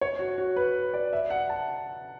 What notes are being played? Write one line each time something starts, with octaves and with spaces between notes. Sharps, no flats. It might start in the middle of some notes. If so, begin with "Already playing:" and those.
C#5
F#4
F#4
B4
D5
E5
F#5
A5